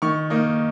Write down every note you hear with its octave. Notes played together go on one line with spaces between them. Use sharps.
D#3 C#6
A#3 D#4